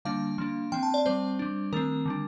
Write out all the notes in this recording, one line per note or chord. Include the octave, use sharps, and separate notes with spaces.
D3 G3 A#3 D4 F5
F3 A#3 D4
F3 C4 G5
A5
D5
G3 C4 C5
G3 D4
D#3 A3 C4 A#4
D3 G3 D4